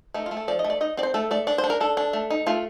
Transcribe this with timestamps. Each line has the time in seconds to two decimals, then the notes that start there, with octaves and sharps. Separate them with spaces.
0.14 A3 D#4
0.26 F4
0.31 A3
0.37 A4
0.48 F3 D5
0.59 D#5
0.64 A3
0.70 D5
0.81 D#4 D#5
0.97 C4 D5
1.03 C5
1.14 A3 A4
1.31 A3 D5
1.47 D4 D5
1.58 C5
1.64 D4
1.70 A#4
1.80 D4 A4
1.97 D4
2.13 A3
2.30 D#4
2.46 A3 F4